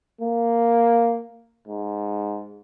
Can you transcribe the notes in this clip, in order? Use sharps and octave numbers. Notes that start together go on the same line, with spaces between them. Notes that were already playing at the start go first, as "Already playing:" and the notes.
A#3
G#2